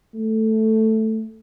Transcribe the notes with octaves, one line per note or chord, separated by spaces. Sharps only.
A3